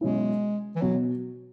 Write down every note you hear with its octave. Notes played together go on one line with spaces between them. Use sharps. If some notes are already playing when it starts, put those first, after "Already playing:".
B2 F#3 G#3 C#4 E4
E3
B2 F#3